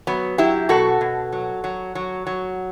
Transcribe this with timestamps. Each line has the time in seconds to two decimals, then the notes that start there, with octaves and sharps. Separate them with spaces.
0.07 F#3 B3
0.38 F#3 E4 G4
0.69 B2 F#4 A4
1.01 B2
1.32 F#3
1.64 F#3
1.95 F#3
2.27 F#3